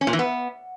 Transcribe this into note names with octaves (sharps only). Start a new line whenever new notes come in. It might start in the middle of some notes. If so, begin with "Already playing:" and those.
C#4
A#2
E3
B3